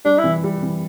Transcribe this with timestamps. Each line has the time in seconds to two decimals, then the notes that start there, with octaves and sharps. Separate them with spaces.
0.05 G3 D4
0.18 E4
0.24 E3
0.44 G3
0.63 E3